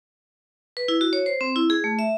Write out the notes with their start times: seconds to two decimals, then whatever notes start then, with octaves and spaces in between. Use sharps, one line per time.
0.77 B4
0.88 E4
1.01 F#4
1.13 C#5
1.26 C5
1.41 C4
1.56 E4
1.70 G#4
1.84 A3
1.99 E5